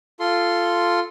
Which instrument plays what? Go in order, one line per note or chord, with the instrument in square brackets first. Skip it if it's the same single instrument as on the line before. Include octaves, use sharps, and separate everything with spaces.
[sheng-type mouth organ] F4 A4 C6